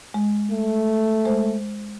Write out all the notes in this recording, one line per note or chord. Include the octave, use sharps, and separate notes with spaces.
G#3
A3
G#3 C5